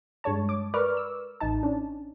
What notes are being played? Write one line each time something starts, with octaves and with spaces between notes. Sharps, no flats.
G2 G#3 C#5 A5
D6
A#4 B4 D5 C#6 D6 F6
E6
A1 D#4 A5
C#4 D4